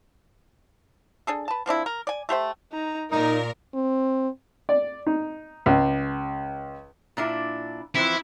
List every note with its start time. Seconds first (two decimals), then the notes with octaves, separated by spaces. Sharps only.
1.27 D4 G#4 A4
1.48 B4 A5
1.66 F3 C4 D4 E4
1.86 A#4
2.07 D5 G#5
2.29 A3 G4 C5 E5
2.72 D#4 A#5
3.12 A#2 D#4 A#4 D5
3.74 C4
4.69 D5
5.07 D#4
5.66 C#2
7.17 A#2 D4 E4
7.95 E3 F3 C4 E4